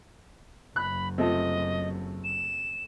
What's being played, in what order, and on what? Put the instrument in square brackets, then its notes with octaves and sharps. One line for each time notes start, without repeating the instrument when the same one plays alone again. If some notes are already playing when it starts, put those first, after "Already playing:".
[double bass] F#1 F#2 [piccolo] B5 [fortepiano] F#6
[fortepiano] C3 F3 A3 [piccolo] D#5
[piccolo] E7